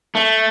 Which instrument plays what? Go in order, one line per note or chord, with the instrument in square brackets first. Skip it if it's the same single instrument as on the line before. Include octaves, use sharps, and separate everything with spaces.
[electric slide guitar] A3